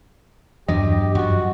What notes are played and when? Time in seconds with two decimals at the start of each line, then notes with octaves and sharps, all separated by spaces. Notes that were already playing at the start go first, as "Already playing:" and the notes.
0.68 E2 G2 F#3 G4 D#5
1.15 F#2 F3 F#4